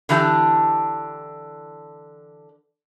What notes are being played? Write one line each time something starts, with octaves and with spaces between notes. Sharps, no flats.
D3 E3 D4 G4